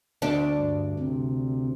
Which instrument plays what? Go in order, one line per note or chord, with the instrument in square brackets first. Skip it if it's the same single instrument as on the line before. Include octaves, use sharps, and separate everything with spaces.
[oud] D2 D4
[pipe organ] G2
C3